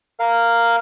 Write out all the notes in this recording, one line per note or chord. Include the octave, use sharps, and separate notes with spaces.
A#4 F5